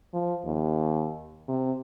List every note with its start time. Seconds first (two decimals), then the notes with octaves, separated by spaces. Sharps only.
0.13 F3
0.45 D#2
1.48 C3